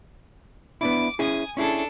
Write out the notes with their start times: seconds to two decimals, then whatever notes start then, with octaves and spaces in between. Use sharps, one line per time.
0.81 B3 D4 E4 D6
1.19 C#4 E4 G#4 G#5 D#6
1.57 C#4 D4 E4 G#4 A4